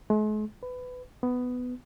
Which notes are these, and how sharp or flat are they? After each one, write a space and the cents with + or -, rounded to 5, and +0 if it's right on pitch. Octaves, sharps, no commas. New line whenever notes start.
G#3 +45
B4 +20
B3 +10